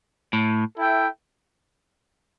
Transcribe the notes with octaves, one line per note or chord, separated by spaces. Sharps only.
A2
E4 A4 E5 G5